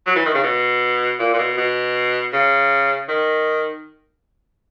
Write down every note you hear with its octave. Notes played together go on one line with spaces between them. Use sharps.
F#3
E3
D#3
C#3
B2
A#2
A#2
B2
B2
C#3
D#3